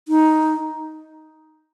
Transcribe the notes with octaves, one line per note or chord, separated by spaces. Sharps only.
D#4